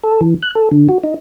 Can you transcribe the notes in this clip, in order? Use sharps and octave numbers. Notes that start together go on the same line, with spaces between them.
A4
E3
F#6
A4
D3
F#4
D#4